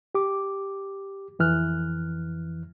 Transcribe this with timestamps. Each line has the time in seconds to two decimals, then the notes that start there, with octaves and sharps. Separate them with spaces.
0.15 G4 D6
1.39 F2 E3 F6 F#6